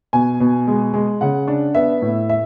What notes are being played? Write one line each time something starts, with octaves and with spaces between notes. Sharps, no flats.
B2 G#5
B2
G#3
G#3
C#3 F#5
D4
B3 E5
A2
E5